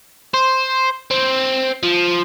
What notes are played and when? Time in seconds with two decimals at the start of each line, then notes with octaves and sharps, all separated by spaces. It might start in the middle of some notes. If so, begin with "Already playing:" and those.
0.34 C5
1.11 C4
1.83 F3